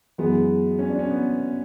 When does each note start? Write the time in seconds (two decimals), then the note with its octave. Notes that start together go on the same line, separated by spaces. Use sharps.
0.18 F#2 E3 G#3 B3
0.79 C#4
0.90 D4
0.99 C#4
1.10 B3